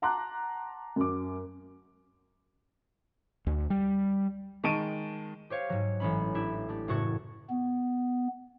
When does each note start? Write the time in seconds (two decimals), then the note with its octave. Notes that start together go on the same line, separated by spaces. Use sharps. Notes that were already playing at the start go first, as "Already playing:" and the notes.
0.02 F#5 A5 A#5 C6 D6 F#6
0.96 F#2 D6
3.47 D2
3.70 G3
4.64 D#3 G#3 A5 C#6 D7 D#7
5.50 G4 C5 C#5 F5
5.70 G#2 F#3
6.00 A1 G#3 C#4 B5
6.34 D4 E4 G4
6.68 A3 D4 G4
6.88 F#1 A2 F#4 A4 C#6 G#6
7.50 B3